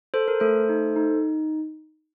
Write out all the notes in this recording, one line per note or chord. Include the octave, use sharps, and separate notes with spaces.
A4 C5
A#4
A3 A4 C5
D#4
D#4